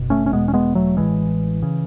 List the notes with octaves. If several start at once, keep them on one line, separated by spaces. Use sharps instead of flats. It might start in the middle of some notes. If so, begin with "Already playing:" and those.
Already playing: F#1 B2
A3 C#4
C#4
E1 E2 B2 G#3 B3
C#4
G#3 B3
F#3 A3
A1 A2 E3 G#3
C#3